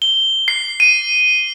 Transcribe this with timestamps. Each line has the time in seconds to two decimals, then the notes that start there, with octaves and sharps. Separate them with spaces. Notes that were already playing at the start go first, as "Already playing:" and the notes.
0.02 G7
0.48 C7
0.80 D#7